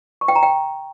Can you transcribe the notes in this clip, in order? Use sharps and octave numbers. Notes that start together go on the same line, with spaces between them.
C#6
G5
A#5
G5